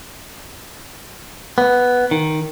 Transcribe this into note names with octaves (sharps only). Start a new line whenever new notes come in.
B3
D#3